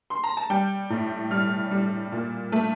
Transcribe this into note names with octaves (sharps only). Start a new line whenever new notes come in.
C6
A#5
A5
G3 G5
A2
G3 F6
G3
A#2
A3